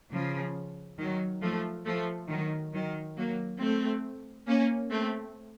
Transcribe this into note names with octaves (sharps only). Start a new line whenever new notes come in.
C#3 F3
D#3 F#3
F3 A3
F3 A3
D#3 F#3
D#3 F#3
F#3 A#3
A3 C4
A#3 C#4
A3 C4